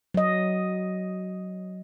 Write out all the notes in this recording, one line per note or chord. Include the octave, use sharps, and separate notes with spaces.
F#3 D#5